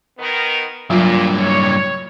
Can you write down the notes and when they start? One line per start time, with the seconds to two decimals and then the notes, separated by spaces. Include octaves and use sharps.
0.18 D#3 B3 A#4
0.90 G2 A#2 F#3 A#3 F4
1.35 C#5